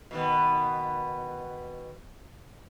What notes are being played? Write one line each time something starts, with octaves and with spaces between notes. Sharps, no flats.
B2 D#3 B3